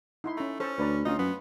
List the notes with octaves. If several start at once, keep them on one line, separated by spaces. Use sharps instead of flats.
D#4 E4 C6
A3 C#4 A#5
C#4 A4 C5
D2 B4 D5 A#5
D2 C#4 D#4 F4 D#5
F#2 B3